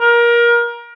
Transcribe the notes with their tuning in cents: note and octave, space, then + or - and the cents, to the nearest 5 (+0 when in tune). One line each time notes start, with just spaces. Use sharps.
A#4 +25